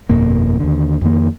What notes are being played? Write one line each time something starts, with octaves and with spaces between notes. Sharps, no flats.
G1 F2 B2 A#3
D#2 D3
F2 D#3 A#3